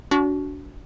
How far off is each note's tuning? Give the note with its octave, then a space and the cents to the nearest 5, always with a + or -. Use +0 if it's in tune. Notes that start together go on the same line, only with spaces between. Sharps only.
D4 -35 F#4 +0